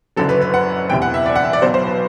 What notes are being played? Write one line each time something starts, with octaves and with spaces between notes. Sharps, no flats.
F#1 F#2 D3 F#3 A4
B4
B4
F#5
E1 E2 C3 E3 G5
F#5
E5
D5
F#5
E5
D5
B1 B2 F#3 C5
C5
B4